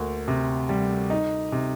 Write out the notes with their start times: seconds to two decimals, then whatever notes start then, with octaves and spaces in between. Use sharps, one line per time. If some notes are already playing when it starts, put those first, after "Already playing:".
Already playing: D2 A#3
0.28 C3
0.69 G3
1.10 D#4
1.52 C3